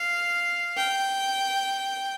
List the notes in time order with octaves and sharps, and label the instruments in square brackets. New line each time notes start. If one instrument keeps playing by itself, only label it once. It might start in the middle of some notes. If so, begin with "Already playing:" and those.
Already playing: [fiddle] F5
G5